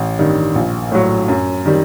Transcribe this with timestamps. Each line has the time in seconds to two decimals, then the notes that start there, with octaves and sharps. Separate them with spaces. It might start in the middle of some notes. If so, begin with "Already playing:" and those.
Already playing: A1
0.19 G2 D#3 G3
0.55 A#1
0.91 A2 F#3
1.28 F#2
1.65 D#3 G3